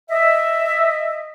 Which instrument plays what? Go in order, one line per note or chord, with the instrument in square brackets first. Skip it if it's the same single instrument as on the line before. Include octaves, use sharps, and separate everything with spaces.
[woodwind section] D#5 E5